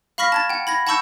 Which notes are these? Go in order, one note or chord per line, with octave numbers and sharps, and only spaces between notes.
F5 B5 C#6 F6 A#6 B6
A5 G#6 A6
F#5 G5
B5 G#6 A#6
F#5 A5 B5 C#6 E6 G6